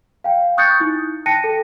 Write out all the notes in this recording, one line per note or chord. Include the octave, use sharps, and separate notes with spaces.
F5 G5
C#6 D#6 F#6 G6 A6 C#7
D#4 E4
G5 A5 F#6 A#6 C#7 D#7
A4